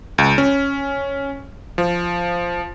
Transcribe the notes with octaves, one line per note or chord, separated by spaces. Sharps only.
C#2
C#4
F3